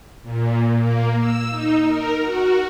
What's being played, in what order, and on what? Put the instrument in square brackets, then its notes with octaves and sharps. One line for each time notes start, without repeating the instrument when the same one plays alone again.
[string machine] A#2
A#3
E6
D#4
A#4
F#4